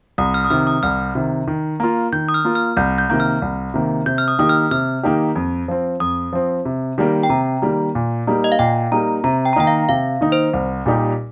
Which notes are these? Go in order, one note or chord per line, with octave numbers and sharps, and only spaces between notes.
C2 D#6
F6
D#6
C3 D#3 F6
D#6
C2 F6
C3 D#3
D#3
A#3 F4
D#3 G6
D#6
F6
A#3 F4
F6
C2 G6
G6
C3 D#3 A#3 G6
F6
C2
C3 D#3 A#3
C3 G6
F6
D#6
D#3 A#3 D#4 G4 D#6
F6
C3 F6
D#3 A#3 D#4 G4
F2
F3 C4
F2 D#6
F3 C4
C3
D#3 G3 A#3
G5
C3 A#5
D#3 G3 A#3
A#2
G3 A#3 D#4
D#5
F5
A#2 G5
G3 A#3 D#4 A#5
C3 A#5
G5
A#5
D#3 A#3 D#4 G5
F5
C3 F5
D#3 A#3 D#4
C5
C2
A#2 G3 D#4 G4